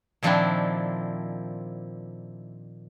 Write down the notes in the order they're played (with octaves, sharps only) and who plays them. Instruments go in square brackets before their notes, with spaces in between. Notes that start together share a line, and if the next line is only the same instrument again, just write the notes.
[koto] A#2 D#3 F3 C4 D4 E4